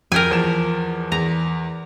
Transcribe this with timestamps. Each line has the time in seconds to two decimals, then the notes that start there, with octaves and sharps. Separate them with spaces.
0.12 F2 A#4 G5 G#5
0.30 E2 F3 E7
1.12 E2 A#5